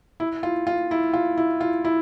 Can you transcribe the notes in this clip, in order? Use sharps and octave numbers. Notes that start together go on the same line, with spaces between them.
E4
F4
F4
E4
F4
E4
F4
E4